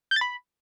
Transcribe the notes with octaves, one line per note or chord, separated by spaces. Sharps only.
G6
A6
B5